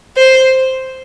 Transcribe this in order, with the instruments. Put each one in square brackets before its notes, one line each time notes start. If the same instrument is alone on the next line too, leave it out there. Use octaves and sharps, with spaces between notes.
[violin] C5